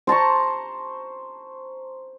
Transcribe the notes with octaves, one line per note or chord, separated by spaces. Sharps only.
C5 A5 A#5 C#6